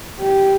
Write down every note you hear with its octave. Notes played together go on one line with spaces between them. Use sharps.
G4